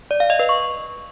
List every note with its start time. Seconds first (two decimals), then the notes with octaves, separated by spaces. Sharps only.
0.11 D5
0.20 F5
0.30 D#5
0.39 B4
0.49 C#6